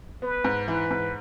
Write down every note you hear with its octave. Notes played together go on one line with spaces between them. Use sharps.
B3 B4
G#2
E3 B4
G#2